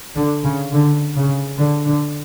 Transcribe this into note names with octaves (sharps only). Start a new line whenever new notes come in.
D3
C#3
D3
C#3
D3
D3